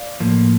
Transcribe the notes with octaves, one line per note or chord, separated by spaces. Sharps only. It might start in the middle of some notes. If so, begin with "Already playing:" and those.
Already playing: D5 F5
A2 F3 A#3